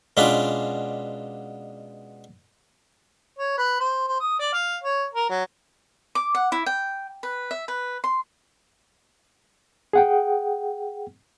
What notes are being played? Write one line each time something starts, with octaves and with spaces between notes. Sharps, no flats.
B2 G#3 C#4 D4 F4 B4
C#5
B4
C5
C5
D#6
D5
F5
C#5
A#4
F#3
D6
F#5
E4
G5
B4
E5
B4
C6
G#4 F#5 G5